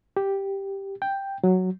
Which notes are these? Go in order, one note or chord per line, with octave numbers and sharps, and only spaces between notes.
G4
G5
F#3